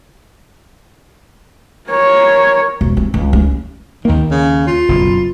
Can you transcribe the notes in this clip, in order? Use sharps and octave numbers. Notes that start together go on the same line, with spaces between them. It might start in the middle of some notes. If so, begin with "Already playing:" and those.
A#4 C#5
E1
C4
C#2
C#4
D#2 D#3 A#3
C#3
F4
F#1 B2